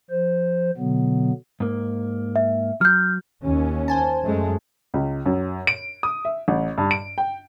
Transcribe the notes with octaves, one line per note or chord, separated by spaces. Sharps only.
F3 C5
B2 D3 F#3 B3
G#2 A#3
E5
F#3 F6 G6
D#2 C#4
C5 G#5 A5
F#2 G#3 A3
C#2
F#2
D7
D#6
E5
A1
G2
D7
G5